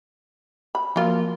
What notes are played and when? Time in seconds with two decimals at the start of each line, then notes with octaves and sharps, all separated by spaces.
0.75 B5
0.96 F3 F#3 A#3 F4 A#4